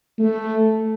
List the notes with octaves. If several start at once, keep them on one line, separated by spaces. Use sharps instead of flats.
A3